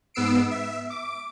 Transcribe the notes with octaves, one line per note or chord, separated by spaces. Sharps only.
G#2 B3 E6 C7 D7
E5
D6